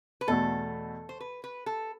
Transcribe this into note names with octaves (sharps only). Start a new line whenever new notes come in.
B4
E2 B2 A3 A4
C5
B4
B4
A4